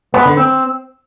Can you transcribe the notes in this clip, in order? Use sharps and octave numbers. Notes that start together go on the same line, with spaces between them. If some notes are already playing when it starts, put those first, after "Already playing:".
B3
D3
C4